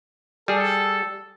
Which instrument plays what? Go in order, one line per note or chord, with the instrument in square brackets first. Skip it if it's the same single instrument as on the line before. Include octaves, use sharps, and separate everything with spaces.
[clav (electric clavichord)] G3 G#4 [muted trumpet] A4